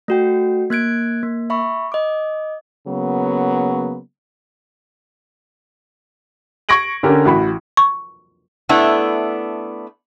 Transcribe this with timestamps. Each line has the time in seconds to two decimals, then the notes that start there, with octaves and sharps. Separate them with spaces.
0.08 A3 F#4 G5
0.70 A#3 F#6 G#6 D7
1.23 A#3
1.50 E5 B5 C#6
1.92 D#5 D6
2.87 C#3 F#3 A#3 B3
6.69 C#6 G#6 A#6 D7 F#7
7.03 D3 C#4 G4 A#4
7.25 A1 F#4 B5
7.77 C#6
8.69 A3 B3 D4 E4